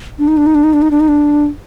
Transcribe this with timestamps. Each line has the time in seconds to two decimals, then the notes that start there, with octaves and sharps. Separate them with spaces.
0.19 D4
0.28 D#4
0.37 D4
0.46 D#4
0.55 D4
0.64 D#4
0.73 D4
0.82 D#4
0.91 D4
1.00 D#4
1.08 D4